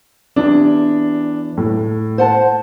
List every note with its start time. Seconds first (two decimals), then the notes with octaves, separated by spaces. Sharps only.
0.36 E2 D4 G4
1.57 A2
2.18 C5 F#5 A5